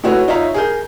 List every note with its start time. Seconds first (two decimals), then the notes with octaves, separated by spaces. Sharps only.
0.04 A3 E4 F#4 B4 C#5
0.28 D#4 F4 C#5 E5 A#5
0.54 G#4 A#4 G6